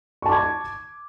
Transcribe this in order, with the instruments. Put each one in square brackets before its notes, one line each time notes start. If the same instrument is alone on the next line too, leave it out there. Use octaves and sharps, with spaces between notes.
[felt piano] C#6
A5
D6
G#6